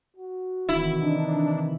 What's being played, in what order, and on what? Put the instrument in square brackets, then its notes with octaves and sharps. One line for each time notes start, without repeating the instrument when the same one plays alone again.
[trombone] F#4
[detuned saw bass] D1 [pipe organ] C3 D#3 E3 [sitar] E4
[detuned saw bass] D4 [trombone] D#4